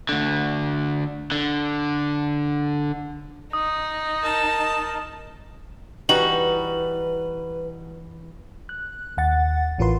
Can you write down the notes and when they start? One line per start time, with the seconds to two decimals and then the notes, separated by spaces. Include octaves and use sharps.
0.09 D2 D3
1.32 D3
3.53 D#4 D#6
4.23 A#4 D#5 A5
6.09 E3 G3 D#4 F#4 B4 F#7
8.69 F#6
9.17 D#2 F#5 A6
9.78 A1 E3 F4 A#4 B4 C6